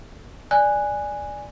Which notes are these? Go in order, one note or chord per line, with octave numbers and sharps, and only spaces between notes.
D5 G#5 F#6